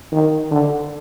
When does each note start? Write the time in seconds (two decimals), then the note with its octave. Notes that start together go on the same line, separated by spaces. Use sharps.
0.12 D#3
0.51 D3